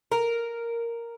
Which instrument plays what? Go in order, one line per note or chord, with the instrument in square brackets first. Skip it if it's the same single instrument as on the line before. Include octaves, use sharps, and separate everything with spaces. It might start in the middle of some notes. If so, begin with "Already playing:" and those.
[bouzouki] A#4